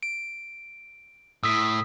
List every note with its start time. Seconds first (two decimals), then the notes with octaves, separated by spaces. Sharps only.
0.03 D7
1.43 A2 D#6 E6 B6